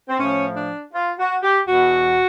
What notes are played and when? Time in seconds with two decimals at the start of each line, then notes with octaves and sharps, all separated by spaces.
0.09 C4
0.19 A2 F3 C#4
0.56 D4
0.94 F4
1.18 F#4
1.42 G4
1.67 E2 B2 F#4